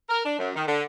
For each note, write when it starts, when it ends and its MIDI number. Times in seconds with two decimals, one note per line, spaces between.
0.08 0.21 70
0.24 0.37 62
0.38 0.50 42
0.54 0.62 51
0.66 0.82 50